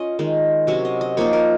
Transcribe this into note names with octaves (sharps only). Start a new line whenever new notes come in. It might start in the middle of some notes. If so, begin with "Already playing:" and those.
Already playing: C#4 F4 C#5 D#5
D#3 G#3 D#4
C3 F#3 C#4 C#5
D#5
D#5
F3 A#3 D#4 C#5
A#4